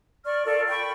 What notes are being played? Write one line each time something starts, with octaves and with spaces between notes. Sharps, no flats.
D5 C#6 F6
F4 A4 A#4 D5
G5 B5 C#6